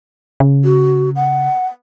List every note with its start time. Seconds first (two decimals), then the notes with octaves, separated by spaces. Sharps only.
0.40 C#3
0.64 F#4
1.16 F#5